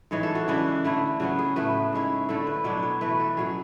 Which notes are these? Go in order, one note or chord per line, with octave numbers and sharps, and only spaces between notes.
G#2 E3 G#3 C#5
A4
F#4
C#3 E3 G#3 D4 E4
D3 A3 E4
C#3 F#3 B3 F#4
G#4
A2 F#3 A3 B4
G#2 G#3 C#4 E4
D3 A3 E4 A4
B4
B2 F#3 B3 D4 C#5
C#5
E3 A3 E4 B4
A4
B2 F#3 C#4 G#4